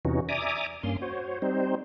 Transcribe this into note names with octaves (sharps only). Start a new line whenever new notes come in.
E2 C3 E3 C#4 D#4 F#4
D5 E5 G#5 A#5 D6 D#6
G2 A#3 C#4 C6
F#4 C5 C#5
G3 C4 D#4 C5